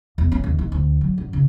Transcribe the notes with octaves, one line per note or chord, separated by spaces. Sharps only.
E2
C#4
D#2
D#3
D2
F#3
F#2
C#3